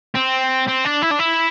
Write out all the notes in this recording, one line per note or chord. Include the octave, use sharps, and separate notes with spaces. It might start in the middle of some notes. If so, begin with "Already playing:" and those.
C4
C4
D4
E4
D4
E4